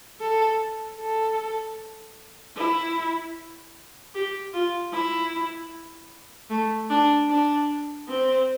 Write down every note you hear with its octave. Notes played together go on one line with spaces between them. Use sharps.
A4
A4
E4
G4
F4
E4
A3
D4
D4
C4